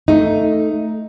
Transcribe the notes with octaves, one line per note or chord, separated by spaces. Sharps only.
A3 D#4